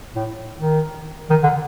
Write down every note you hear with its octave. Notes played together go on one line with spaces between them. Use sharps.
A2
D#3
D#3
D3